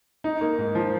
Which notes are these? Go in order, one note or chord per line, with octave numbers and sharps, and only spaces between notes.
D#4
A#3
G#2
F3